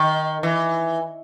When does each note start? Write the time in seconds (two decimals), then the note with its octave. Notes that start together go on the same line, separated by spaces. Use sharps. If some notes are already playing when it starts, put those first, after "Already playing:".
Already playing: D#3
0.43 E3